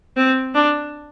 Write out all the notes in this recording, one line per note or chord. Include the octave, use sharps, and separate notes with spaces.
C4
D4